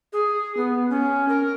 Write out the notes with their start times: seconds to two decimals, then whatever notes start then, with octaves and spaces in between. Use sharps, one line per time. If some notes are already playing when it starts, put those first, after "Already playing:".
0.13 G#4
0.57 B3
0.90 C#4
1.29 A#4